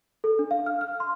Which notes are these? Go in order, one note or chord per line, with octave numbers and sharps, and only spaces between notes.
A4
D4
F5
F6
F6
C6